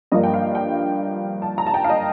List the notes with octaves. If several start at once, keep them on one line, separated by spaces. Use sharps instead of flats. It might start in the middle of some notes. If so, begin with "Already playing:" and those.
G2 F3 A#3 D4 D#5
G5
F5
G5
A5
A#5
A5
G5
F5
D#5